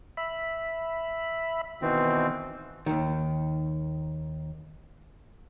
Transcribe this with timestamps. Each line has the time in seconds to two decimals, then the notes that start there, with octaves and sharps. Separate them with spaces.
0.17 E5 B5
1.82 B2 D#3 E3 C4
2.86 D#2 D#3